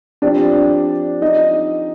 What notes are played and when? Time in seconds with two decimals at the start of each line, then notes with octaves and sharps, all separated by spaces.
0.22 F3 C4 D4 G4 D5
1.22 D#4 D#5